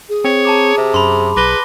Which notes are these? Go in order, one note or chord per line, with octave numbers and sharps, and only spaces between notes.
G#4
C4 C#5
A5 A#5 D6
C3
F#2 B5 C6
B1 B4 D6 A#6 G7